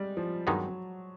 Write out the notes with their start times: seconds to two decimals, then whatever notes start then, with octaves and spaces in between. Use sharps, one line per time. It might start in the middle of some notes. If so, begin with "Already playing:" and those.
Already playing: G3 G#3
0.17 F3
0.47 G2 D#3 F#3 G#3 B3 D#4